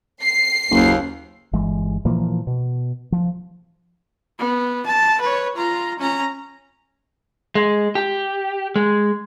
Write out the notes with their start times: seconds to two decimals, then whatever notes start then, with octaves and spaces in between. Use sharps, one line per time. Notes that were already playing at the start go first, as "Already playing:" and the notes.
0.22 C7
0.71 F#1 D#2
1.53 G1 E3 G#3
2.05 A#2 E3 F3 A#3
2.47 B2
3.12 F3
4.39 B3
4.86 A5
5.21 B4 C#5
5.55 F4 A#5
5.99 C#4 A#5
7.55 G#3
7.95 G4
8.76 G#3